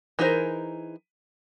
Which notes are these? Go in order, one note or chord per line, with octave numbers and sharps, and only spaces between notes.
E3 D#4 G#4 A#4 C5